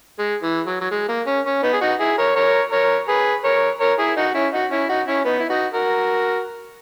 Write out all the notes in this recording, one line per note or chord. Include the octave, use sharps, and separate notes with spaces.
G#3
E3
F#3
F#3
G#3
A#3
C#4
C#4
B3 D#4
G#4
D#4 F#4
E4 G#4
A#4 C#5
A#4 C#5
A#4 C#5
G#4 B4
A#4 C#5
A#4 C#5
E4 G#4
D#4 F#4
C#4 E4
D#4 F#4
C#4 E4
D#4 F#4
C#4 E4
B3 D#4
E4
D#4 F#4
F#4 A#4